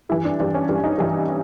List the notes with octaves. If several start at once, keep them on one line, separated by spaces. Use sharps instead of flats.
G2 E3 G3 E4
D4
G2 E3 G3 D4
C#4
G2 E3 G3 D4
D#4
G2 E3 G3